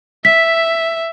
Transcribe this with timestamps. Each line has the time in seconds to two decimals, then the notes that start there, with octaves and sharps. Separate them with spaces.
0.25 E5 B6